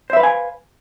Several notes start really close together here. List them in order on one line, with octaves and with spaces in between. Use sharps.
C5 E5 B4 F5 G#5